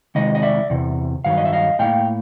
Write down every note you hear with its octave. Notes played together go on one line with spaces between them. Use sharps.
C3 D#3 G#3 D#5
D#5
D5 E5
E2 C3
G2 D#3 F#3 F5
D#5
E5
D#5 F5
A2 F3 A#3 F5 G5